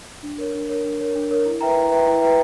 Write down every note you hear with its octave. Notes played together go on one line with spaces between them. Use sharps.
D4
A#4 C#5
D4
A#4 C#5
D4
A#4 C#5
D4
A#4 C#5
E4
B4 E5 G5 A#5
E4
B4 E5 G5 A#5
E4
B4 E5 G5 A#5